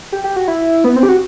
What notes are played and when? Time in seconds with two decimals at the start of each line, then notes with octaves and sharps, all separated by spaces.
0.12 G4
0.24 G4
0.36 F#4
0.48 E4
0.84 B3
0.96 C4
1.03 G4
1.09 F#4